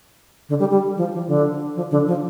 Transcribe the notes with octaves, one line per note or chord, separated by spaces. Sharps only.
D3
G3
G3
F3
F3
D3
F3
D3
F3